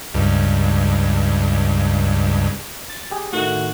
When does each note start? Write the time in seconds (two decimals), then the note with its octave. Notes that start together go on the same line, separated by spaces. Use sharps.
0.14 C#2 G2
2.90 A6
3.11 G4 G#4
3.33 A2 D#3 A3 F#4